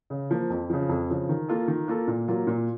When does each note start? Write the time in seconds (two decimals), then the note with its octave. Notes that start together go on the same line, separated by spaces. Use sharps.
0.10 C#3
0.31 F3 A#3
0.50 F2
0.70 C#3 F3
0.89 F2
1.10 C#3 F3
1.29 D#3
1.48 A#3 F4 A4
1.68 D#3
1.88 A#3 F4 A4
2.07 A#2
2.28 F#3 A#3 F4
2.47 A#2